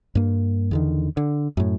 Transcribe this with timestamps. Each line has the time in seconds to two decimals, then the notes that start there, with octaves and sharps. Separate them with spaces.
0.15 G2 A#3
0.71 E2 D3 D#3
1.17 D3
1.57 F#2 A2